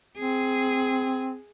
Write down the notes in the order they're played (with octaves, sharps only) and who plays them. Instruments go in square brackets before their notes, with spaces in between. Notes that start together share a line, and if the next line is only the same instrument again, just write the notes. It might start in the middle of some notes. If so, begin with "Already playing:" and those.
[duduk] C4 [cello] G#4